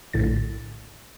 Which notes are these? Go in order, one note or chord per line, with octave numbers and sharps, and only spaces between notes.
A#1 A2 D3 A6